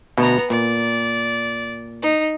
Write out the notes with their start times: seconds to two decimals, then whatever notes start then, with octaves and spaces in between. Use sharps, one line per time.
0.18 D2 B2 B3 A#5
0.50 A#2 D5
2.02 D#4